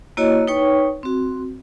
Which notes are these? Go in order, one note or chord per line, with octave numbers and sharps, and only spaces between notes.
A#3 E4 F#4 C#5 D#5
D#4 B4 C#5 G5 C#6
C4 F#4